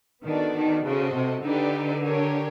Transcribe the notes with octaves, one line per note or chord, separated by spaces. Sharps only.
D#3 B3 D4 F#4 A4 D5
D#3
C#3 F#4 A4 C5 D#5
C3
D3 D#4 G4 B4 D5
D4 G4 A#4 C#5